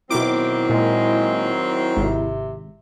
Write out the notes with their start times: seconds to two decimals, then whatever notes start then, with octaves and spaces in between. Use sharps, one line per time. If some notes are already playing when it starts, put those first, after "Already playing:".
0.10 B2 D#3 F#3 C4 E4 D6
0.69 A#2 G#3
1.97 G#1 C3